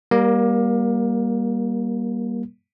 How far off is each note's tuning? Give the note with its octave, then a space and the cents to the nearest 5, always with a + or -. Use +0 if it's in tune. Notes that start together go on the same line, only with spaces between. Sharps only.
G3 +0 A#3 +25 A#4 +0